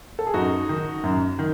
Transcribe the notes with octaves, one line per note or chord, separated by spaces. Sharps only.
A4
G#4
F#2 D#4 F#4
D#3
F#2
D#3